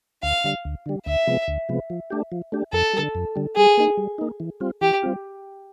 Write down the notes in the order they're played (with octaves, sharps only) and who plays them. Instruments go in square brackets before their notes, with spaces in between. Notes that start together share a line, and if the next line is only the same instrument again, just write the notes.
[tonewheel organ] D2 [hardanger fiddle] F5
[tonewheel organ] D3 G3
D2
D3 G3
[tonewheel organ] D2 [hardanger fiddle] E5
[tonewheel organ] C3 F3 G#3 B3
D2
C3 F3 G#3 B3
F3
A3 D4 G4
F3
A3 D4 G4
[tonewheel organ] F2 [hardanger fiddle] A4
[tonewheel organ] G3
D3
F2
D3 G3
[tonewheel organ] G3 [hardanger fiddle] G#4
[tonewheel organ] A#3 D#4
G3
A#3 D#4
E3
G3 C4 F4
[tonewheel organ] E3 [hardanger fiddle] G4
[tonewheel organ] G3 C4 F4